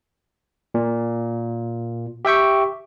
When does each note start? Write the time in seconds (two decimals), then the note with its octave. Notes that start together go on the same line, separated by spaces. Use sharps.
0.74 A#2
2.25 G4 E5 G5 C#6